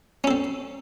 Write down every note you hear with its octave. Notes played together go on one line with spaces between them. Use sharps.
C4 C#4 A4